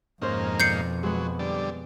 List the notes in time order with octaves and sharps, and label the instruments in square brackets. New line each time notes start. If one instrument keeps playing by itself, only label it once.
[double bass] F2 B2 [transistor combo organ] G#2 A#3 D#4 [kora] C#4 C5
[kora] D5 [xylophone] G6 C7 C#7
[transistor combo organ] F#3 [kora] G#3 B3
[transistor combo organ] D3 G3 D5